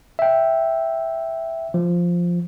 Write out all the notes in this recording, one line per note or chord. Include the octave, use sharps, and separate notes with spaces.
E5 G5
F3